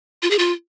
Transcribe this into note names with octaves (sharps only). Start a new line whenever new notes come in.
F4
G#4
F4